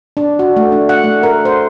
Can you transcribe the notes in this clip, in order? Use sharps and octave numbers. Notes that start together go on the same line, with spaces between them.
D4
F#4
A3
D4
F#5
A3
A#4
C5